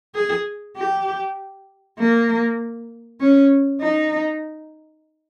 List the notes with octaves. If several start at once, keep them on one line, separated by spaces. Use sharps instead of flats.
G#4
G4
A#3
C#4
D#4